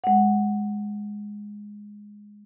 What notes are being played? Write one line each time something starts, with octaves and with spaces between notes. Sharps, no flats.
G#3 F#5